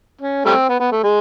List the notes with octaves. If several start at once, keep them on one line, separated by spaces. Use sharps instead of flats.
C#4
G3 A3 C4
B3
B3
A3
G#3